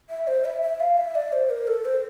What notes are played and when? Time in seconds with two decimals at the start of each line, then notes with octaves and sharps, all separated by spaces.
0.10 E5
0.27 C5
0.45 E5
0.62 E5
0.80 F5
0.97 E5
1.15 D5
1.33 C5
1.50 A#4
1.68 A4
1.85 C5